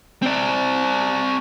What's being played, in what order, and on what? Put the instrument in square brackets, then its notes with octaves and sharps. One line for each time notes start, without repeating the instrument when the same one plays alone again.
[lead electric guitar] C4 D5